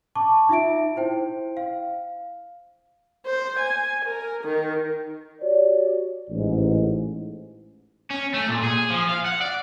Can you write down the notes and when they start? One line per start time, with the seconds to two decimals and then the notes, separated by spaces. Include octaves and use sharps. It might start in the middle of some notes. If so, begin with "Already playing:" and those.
0.15 A5 C#6 D6
0.49 D#4 F4 E5 D7
0.96 E4 C5 G5
1.57 F5
3.26 C5
3.60 G#5
4.05 A#4
4.44 D#3
5.42 F#4 G4 C#5 D5
6.30 A1 G#2
8.10 C#4
8.34 A3
8.48 A#2
8.64 G#4
8.91 F3
9.09 F5
9.26 F#5
9.41 D5